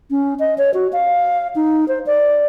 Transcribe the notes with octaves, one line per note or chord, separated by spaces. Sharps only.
C#4
D#5
C#5
F#4
F5
D#4
C5
D5